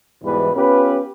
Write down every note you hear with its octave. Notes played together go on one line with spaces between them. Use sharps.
E2 G#2 B2 E3 G3 B4
B3 C#4 F4 G4 B4